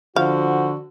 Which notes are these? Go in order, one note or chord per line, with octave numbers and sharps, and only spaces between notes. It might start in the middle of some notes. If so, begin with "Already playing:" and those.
D3 F3 F#4 F5